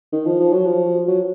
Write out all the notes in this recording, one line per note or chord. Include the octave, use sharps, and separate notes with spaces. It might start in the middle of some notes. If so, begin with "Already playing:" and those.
D#3
F3
F3
F#3
F3
F#3